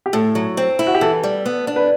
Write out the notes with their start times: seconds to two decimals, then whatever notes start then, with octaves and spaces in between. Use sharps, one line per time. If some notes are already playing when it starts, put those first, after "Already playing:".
0.06 G4
0.13 A2 A4
0.35 F#3
0.57 C4
0.79 E4
0.87 F#4
0.95 G4
1.01 E3 A4
1.24 G3
1.46 B3
1.67 D4
1.76 B4